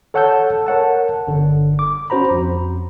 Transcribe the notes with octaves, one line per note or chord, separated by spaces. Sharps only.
A4 C#5 F#5 A5 E6 G6
A#4 C#5 F#5 A5
G1 D3
D6
C#4 F#4 C5 A#5 B5
F2